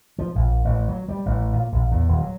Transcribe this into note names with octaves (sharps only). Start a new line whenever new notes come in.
F3
A#1
A1
F#3
G3
A1
A#2
A#1
E2
D#1
F#3